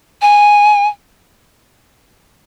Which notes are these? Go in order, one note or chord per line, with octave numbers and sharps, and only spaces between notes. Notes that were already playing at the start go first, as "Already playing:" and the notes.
G#5